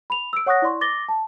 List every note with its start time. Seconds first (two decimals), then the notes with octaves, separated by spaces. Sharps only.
0.10 B5 F7
0.33 E6 D7
0.46 C#5 F#5 C#6 D#6 F#6 A#6
0.62 E4 D5 C6 C#6
0.81 D6 A6 A#6 G7
1.09 A5